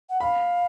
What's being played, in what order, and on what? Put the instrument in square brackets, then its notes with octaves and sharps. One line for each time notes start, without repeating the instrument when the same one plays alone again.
[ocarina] F#5
[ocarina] F5 [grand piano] B5